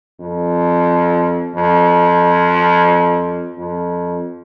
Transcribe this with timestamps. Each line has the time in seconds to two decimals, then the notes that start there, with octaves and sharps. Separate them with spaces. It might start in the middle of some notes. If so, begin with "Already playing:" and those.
0.20 F2
1.55 F2
3.57 F2